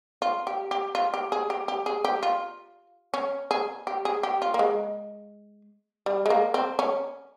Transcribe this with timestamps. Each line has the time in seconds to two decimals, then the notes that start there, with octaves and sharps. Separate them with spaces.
0.22 F4
0.47 G4
0.71 G4
0.95 F4
1.14 G4
1.32 G#4
1.50 G4
1.68 G4
1.86 G#4
2.04 G4
2.23 F4
3.14 C#4
3.51 G#4
3.87 G4
4.05 G#4
4.23 G4
4.42 F4
4.54 A#3
4.59 G#3
6.06 G3
6.26 G#3
6.30 A#3
6.54 C4
6.79 C#4